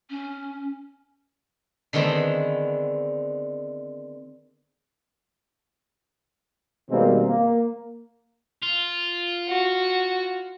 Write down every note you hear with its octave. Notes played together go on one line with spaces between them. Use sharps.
C#4
D3 D#3 G#3 B3 C4
B2 D#3 G3 G#3 A#3 C4
A#3
F4
F#4